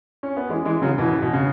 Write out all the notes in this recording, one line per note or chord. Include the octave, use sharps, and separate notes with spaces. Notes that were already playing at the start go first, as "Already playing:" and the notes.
C#4
B3
E3 G#3
E3 G#3
C#3 F#3
B2 E3
B2
C#3